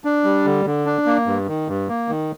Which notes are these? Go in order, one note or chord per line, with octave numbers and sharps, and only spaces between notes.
D4
G3
D3
D3
D4
A#3
G2
D#3
G2
A#3
D#3